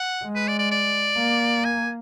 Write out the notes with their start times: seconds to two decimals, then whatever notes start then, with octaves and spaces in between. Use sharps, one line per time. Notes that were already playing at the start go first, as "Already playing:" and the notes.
Already playing: F#5
0.23 G#3
0.35 B4
0.48 D5
0.59 D5
0.71 D5
1.17 A#3
1.65 G#5